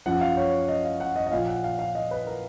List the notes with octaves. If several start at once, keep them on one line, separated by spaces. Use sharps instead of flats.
F#2 F3 F#5
F5
C#5
D#5
F5
F#5
D#5
D#5
A#2 F3 F5
F#5
F5
F5
D#5
B4
A#4